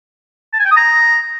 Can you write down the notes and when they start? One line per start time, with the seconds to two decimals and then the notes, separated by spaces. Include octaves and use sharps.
0.53 A5
0.59 G#5
0.65 G5
0.71 D#6
0.77 A#5